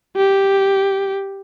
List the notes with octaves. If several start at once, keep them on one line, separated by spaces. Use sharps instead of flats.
G4